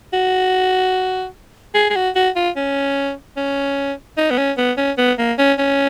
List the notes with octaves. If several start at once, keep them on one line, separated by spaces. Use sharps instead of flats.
F#4
G#4
G#4
F#4
F#4
F4
C#4
C#4
D#4
B3
C#4
B3
C#4
B3
A#3
C#4
C#4